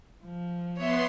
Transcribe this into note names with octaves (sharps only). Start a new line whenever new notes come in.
F3
B3 C#5 E5 C6